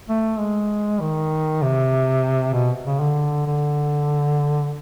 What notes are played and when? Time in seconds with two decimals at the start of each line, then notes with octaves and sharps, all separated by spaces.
0.09 A3
0.39 G#3
1.01 D#3
1.62 C3
2.54 B2
2.85 C#3
3.00 D3
3.46 D3